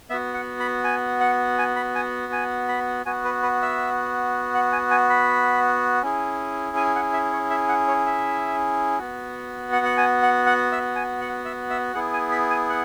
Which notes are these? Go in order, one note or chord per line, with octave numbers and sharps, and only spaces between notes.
B3 F#4 E5
F#5
B5
G#5
F#5
G#5
B5
G#5
G#5
B5
B3 F#4 G#5
B4
B4
E5
F#5
G#5
G#5
B5
C#4 E4 G#4
G#5
F#5
E5
C#5
E5
F#5
C#5
E5
B3 F#4
F#5
F#5
G#5
F#5
F#5
E5
G#5
F#5
E5
E5
B3 E4 G#4 F#5
G#5
B5
G#5
F#5